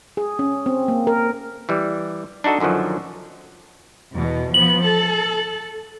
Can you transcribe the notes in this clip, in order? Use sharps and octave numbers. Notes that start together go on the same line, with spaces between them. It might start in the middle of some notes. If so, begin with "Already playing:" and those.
G#4
C#4
C4
A#3
A#4
E3 G3
D4 D#4 F#4 A4 D#5
F#2 D3 D#3 F3 F#3
E2 B2
F3 B3 F#7
A4